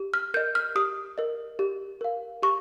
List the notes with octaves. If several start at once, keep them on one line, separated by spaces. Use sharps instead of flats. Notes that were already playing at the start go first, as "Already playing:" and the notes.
Already playing: G4
F6
A#4 D#5 G6
F6
G4 D#6
A#4 D#5
G4
A#4 F5
G4 C#6